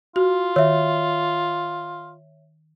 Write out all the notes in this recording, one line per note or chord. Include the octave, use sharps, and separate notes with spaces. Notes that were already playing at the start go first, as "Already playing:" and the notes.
F4 F#4
D#3 C#5 E5